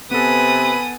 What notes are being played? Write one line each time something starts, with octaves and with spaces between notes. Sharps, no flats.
C3 B3 A4 B4 G#5 D#6